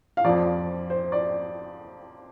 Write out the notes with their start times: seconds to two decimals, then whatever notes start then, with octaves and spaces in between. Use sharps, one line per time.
0.17 F5
0.25 F2 F3 D5
0.90 C5
1.12 D5